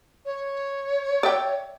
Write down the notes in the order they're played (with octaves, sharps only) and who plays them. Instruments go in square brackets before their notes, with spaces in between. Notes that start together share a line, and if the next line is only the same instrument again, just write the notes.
[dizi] C#5
[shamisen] D5 E5 G5